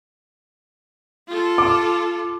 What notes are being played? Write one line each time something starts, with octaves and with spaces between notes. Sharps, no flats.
F4 A4
D6